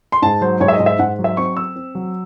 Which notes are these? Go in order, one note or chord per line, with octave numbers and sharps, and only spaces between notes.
C6
G#2 A5
F#3 C5
G#2 C#5
E5
D#5
G#2
E5
G#2 F#5
F#3
E5
C4 C#6
C4 E6
C4
F#3